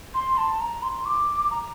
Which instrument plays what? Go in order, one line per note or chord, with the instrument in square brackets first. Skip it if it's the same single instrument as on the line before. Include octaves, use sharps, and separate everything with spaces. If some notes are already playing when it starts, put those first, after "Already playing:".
[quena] C6
A5
A#5
C6
D6
A#5